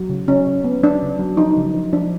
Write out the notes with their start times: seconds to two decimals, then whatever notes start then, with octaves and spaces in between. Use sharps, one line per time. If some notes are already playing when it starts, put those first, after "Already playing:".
Already playing: F#3
0.09 C#3
0.28 C#3 C#4
0.47 C#3
0.64 B3
0.83 F#3 D4
1.02 C#3
1.19 F#3
1.37 F3 D#4
1.57 C#3
1.74 F3
1.93 F3 D4